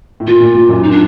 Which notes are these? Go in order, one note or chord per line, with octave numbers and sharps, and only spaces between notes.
A2
A#2 F4
A#2
A#2
F#2
D#4
D4